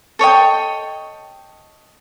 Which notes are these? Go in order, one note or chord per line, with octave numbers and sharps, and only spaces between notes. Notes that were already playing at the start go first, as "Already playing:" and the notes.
A4 C#5 D#5 G5